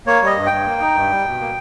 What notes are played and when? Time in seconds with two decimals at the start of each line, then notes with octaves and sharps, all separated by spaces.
0.06 A#3 C#5
0.22 G3 D#5
0.36 G2
0.46 G2 G5
0.66 A#3
0.81 D#4
0.96 G2
1.10 G3
1.26 B2
1.40 A#3